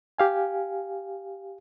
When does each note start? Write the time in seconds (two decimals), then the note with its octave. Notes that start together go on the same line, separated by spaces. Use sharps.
0.18 G4 F5 G#5